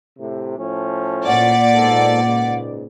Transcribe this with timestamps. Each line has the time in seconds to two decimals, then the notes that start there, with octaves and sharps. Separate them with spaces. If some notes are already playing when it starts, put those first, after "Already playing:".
0.17 A2 C3
0.57 A2 F3 C#4
1.26 A#2 D5 F#5
1.72 G#2 B3 A4
2.22 C#2 G#2